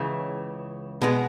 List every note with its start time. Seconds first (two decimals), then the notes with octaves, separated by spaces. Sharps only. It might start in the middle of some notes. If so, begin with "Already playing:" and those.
Already playing: C#2 C#3 E3
1.02 B2 G#3 B3